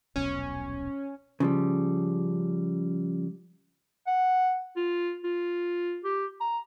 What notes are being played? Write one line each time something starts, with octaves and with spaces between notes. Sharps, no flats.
D#1 B1 B2 C#4
C#3 F3 G3
F#5
F4
F4
G4
A#5